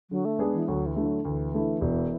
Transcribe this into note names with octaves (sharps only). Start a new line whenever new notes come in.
D3 F#3
A3
G#3 B3 D4 G#4
E3
D2 F#3
E3
D3 A3 E4
F#3
D2 E3
D3 A3 E4
E1